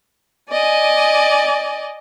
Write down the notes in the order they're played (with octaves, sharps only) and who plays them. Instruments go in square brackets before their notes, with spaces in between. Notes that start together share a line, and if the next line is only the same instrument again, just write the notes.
[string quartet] D5 D#5 G#5